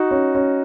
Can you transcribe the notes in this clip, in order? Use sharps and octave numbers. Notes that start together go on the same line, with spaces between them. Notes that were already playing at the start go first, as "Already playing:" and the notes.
Already playing: D#4 F#4
C#4
C#4